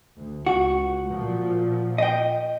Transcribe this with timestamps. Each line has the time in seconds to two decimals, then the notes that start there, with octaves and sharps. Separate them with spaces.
0.16 D2
0.46 C#2 F#4
1.11 A#2 F3
1.98 D#5 G5